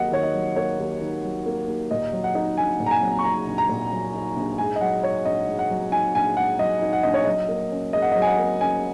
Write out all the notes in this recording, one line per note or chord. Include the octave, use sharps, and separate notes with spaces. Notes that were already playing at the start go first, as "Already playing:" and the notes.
Already playing: D#2 D#3 F#3 A#3 D#5 F#5
D#3 C#5
D#5
F#3
A#3 C#5
D#2
D#3
F#3
A#3
D#2
A#2 D#5
F#3
F#5
D#4
A#1 G#5
A#2
A#5
G#5
F#3
C#6
D#4 A#5
A#1
A#5
A#2
F#3
D#4
A#1
G#2 G#5
D#5
F#3 F#5
D#4 C#5
A#1 D#5
G#2
F#5
F#3
D#4 G#5
A#1 G#5
G#2 F#5
F#3 D#5
D#4
F#5
A#1 D#5
C#5
F#3 D#5
A#3
C#4
G#2 D#5
F#5
F#3 D#5
G#5
F#5
A#3
C#4 G#5